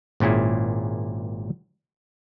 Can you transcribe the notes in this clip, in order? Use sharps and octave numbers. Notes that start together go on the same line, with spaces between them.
G#1 A#2 C#4 E4 G#4